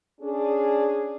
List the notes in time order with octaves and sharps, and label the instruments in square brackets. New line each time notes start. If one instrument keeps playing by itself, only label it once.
[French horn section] C#4 D4 G#4